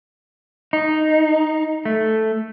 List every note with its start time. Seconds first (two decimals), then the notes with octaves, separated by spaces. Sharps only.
0.73 D#4
1.85 A3